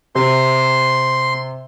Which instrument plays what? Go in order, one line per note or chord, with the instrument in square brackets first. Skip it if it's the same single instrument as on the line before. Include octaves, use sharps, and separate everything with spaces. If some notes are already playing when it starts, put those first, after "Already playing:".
[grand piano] C3 [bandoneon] C6